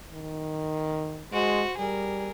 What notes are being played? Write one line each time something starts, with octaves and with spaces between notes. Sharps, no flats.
D#3
G#3 F#4 C5
G3 G#4 A#4